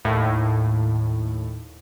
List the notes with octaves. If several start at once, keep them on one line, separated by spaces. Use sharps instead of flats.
D#2 A2